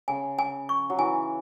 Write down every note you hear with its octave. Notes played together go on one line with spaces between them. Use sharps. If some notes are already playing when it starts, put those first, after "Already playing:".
C#3 G#5
G#5
C#6
F#3
E3 G#5